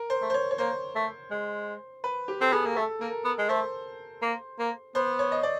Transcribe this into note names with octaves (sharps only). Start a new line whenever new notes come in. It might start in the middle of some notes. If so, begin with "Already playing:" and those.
Already playing: A#4
C5
A3
C5
C#5
C#5
A#3 C5
A3
G#3
B4
G4
C4 A4
B3 G#4
A#3
A3 A4
A#3 A#4
B3
G#3
A3 C5
A#3
A#3
B3 C5
C#5
D#5
D5